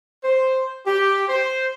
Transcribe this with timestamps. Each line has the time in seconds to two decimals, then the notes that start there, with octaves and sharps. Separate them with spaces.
0.24 C5
0.86 G4
1.29 C5